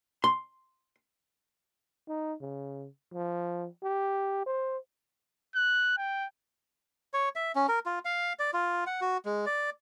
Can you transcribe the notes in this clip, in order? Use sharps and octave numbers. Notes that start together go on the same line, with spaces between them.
C6
D#4
C#3
F3
G4
C5
F#6
G5
C#5
E5
C#4
A#4
F4
F5
D5
F4
F#5
F#4
G#3
D5